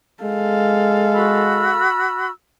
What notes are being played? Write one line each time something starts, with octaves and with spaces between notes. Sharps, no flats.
G#3 A4 F5
F#4 B5 E6